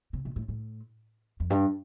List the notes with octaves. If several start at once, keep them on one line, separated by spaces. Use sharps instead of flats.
C3
B2
A2
A2
F2
G2